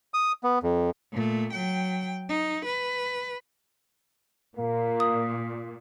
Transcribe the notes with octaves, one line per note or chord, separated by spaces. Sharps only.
D#6
B3
F2
A#2 A3
F#3 G5
D#4
B4
A#2 A#3
D#6